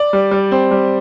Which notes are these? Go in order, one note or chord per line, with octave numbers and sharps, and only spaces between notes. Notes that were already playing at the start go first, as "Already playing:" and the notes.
Already playing: D5
G3
G3
C4
G3